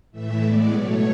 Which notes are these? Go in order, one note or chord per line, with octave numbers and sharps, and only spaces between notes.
A2 E3 A3 E5
A2 G#3 B3 D5
B2 F#3 A3 C#5